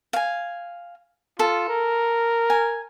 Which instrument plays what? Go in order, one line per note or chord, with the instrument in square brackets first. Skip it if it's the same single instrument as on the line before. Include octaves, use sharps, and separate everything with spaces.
[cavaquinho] F5 G#5
[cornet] F4 [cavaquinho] A4
[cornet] A#4
[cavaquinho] G#5